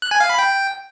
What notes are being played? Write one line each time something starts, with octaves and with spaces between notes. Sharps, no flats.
F#6
G#5
F5
B5
G5